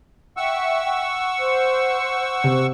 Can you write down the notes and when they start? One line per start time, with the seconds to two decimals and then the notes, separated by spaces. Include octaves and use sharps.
0.37 E5 F#5 G5 C#6 E6
1.38 C5
2.44 C3